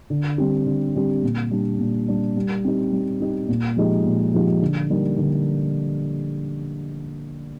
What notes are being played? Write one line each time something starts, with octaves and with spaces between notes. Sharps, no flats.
D3
G3 C4 G4
D3
G3 C4 G4
A#2
G3 D4
A#2
G3 D4
G3
C4 D#4 G4
G3
C4 D#4 G4
A#2
F3 G#3 D#4 G4
A#2
F3 G#3 D#4 G4
D3
G3 A#3 D#4
D3